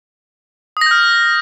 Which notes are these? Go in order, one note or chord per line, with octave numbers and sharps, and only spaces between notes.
D#6 F6 G6 A#6